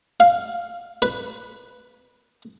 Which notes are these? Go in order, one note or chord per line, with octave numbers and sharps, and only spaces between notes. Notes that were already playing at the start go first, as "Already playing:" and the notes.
F5
B4